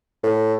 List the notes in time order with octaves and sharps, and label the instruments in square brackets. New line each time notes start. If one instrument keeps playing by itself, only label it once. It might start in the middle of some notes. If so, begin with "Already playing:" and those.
[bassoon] A2